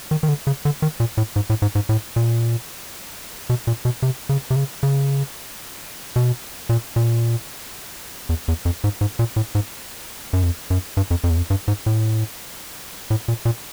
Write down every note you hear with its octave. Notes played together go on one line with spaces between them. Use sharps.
D#3
D#3
D3
C#3
D3
D#3
A#2
A2
G#2
A2
G#2
G#2
A2
A#2
B2
A#2
B2
C3
C#3
C3
C#3
C#3
B2
A#2
A#2
E2
E2
F2
G#2
G#2
A#2
A2
G#2
F#2
F2
F#2
G2
F2
F2
E2
F2
G2
G#2
A2
A2
A#2
A#2